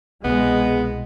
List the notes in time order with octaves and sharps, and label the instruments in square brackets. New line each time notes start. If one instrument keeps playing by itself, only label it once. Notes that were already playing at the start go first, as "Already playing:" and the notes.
[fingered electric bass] C2 B2 [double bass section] G#3 [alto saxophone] B3